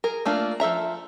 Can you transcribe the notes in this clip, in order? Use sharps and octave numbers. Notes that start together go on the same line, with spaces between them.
G#4 A#4
A3 A#3 D4 F4
F3 A4 E5 A#5